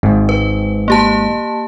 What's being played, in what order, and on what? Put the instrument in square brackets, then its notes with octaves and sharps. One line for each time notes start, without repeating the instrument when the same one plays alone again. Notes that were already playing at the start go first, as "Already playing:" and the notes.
[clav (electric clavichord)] G#1 G#2
[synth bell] B4
A#3 G4 A5